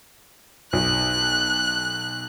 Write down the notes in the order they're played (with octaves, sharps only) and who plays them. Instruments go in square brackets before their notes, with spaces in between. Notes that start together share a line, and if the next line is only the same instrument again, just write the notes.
[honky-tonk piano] B1 [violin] F#6